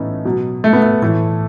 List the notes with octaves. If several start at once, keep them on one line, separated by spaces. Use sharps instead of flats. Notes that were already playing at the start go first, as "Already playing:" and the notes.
Already playing: A2 E3 A3 B3 C#4 D#4
B2 F#3
A3
B3
A3
A2 E3 A3